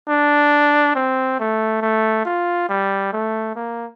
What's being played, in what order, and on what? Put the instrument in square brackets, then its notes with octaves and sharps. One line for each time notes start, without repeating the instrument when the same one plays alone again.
[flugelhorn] D4
C4
A3
A3
F4
G3
A3
A#3